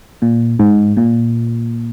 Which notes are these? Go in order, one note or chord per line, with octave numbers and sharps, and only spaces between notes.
A#2
G#2
A#2